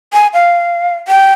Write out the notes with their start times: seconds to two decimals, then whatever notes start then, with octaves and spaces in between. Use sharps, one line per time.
0.13 G#5
0.34 F5
1.08 G5